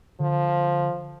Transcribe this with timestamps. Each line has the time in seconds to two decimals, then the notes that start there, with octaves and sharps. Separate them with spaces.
0.20 D3 F3